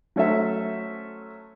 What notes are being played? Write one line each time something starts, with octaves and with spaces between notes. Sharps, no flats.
F#3 A3 C#4 A4 C5 E5